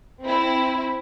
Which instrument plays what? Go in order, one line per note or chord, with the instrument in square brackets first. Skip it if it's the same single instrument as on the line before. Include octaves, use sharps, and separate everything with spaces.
[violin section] C4 E4